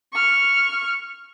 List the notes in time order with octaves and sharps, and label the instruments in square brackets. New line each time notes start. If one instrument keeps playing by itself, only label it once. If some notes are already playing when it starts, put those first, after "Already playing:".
[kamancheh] C#6 F6